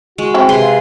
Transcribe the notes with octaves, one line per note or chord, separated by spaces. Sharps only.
G#3 F#4
F#3 C4 E4
C3 G#4 B4 C6
F5